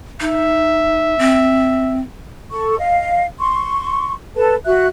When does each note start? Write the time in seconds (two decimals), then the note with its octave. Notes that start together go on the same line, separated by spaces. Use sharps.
0.20 D#4 E5
1.19 C4
2.51 A4 C#6
2.79 D#5 F5
3.39 C6 C#6
4.36 A4 B4 A5
4.65 F#4 E5 F#6